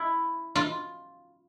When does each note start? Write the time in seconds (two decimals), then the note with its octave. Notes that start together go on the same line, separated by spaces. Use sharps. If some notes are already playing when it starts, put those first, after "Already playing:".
Already playing: E4
0.55 F4